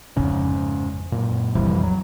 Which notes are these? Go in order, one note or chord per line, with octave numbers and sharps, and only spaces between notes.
A1 F2 G#2 C#3 C#4
F#2 A#2
A#1 F2 C3 E3 G3
F#3